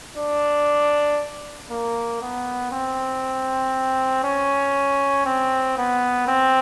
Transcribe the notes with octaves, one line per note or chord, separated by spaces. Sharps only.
D4
A#3
B3
C4
C#4
C4
B3
C4